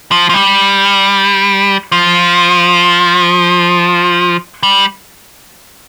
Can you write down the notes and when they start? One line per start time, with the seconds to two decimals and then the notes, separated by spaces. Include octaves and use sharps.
0.12 F3
0.30 F3
0.34 G3
1.92 F3
4.63 G3